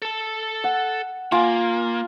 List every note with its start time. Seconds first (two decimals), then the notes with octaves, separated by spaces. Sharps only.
0.02 A4 A5
0.64 F#5
1.32 A#3 F4 F5 G#5